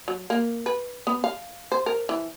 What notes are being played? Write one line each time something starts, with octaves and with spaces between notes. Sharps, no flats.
F#3
A#3
B4
B3
F5
C5
A#4
E3